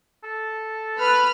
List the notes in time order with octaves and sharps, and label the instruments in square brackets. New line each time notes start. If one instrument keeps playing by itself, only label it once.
[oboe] A4
[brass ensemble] B4 [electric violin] B5 F6